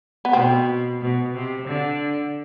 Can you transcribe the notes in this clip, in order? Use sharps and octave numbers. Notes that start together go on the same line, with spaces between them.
B3
B2 C4
B2
C3
D3